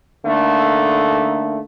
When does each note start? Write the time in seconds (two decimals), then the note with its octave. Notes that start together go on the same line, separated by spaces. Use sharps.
0.25 D3 A3 A#3 D#4